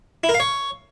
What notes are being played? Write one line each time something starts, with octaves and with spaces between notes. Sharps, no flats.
E4
A#4
F5
C#5